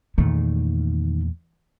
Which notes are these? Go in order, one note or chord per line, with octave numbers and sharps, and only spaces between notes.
E2 A#2 D#3 A3